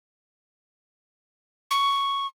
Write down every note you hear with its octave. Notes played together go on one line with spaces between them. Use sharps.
C#6